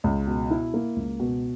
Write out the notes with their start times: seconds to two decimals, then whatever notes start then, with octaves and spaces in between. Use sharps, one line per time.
0.04 C#2
0.27 B2
0.50 E4
0.74 A#3
0.96 C#2
1.20 B2